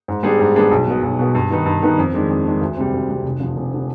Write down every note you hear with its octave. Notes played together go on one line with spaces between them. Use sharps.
G#2
G3 B3 D4 G#4
G#2
G3 B3 D4 G#4
B1
B2 B3
B1
B2 B3
G2
D#3 B3 D#4 B4
G2
D#3 B3 D#4 B4
F2
D#3 G#3 D4
F2
D#3 G#3 D4
D2
C3 G3
D2
C3 G3
F1
F2 D3 F3
F1
D3 F3